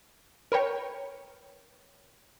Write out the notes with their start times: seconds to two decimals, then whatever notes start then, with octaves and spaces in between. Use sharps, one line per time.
0.52 A#4 B4 C#5 G5